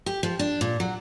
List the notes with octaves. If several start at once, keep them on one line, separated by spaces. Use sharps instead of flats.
G4
F3
D4
A#2
F#3